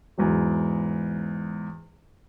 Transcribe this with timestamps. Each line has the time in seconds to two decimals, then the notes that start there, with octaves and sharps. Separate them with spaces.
0.18 E2 G#2 F#3